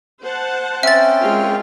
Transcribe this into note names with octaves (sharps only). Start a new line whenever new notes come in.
C5 F#5 A5
C4 C#4 E5 G5 A6
G#3 F4 A#4